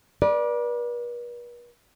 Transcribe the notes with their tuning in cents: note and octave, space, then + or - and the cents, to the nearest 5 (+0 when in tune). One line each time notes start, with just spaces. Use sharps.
B4 -45 D5 +5